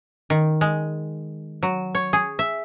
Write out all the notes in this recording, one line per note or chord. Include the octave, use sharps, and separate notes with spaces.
D#3
G#3
F#3
C#5
G#4
E5